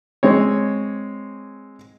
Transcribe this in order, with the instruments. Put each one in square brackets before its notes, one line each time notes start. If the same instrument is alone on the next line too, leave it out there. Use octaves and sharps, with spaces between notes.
[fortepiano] G#3 C4 C#5